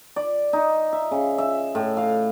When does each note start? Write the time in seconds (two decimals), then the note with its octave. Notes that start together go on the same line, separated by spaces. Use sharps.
0.16 D5
0.53 D#4
0.93 E5
1.11 C#3
1.38 E5
1.75 A2
1.97 F5